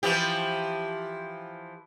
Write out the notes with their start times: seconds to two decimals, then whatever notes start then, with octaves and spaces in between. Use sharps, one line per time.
0.03 E3 F3 G4